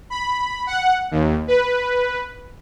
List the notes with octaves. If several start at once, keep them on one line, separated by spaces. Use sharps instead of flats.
B5
F#5
D#2
B4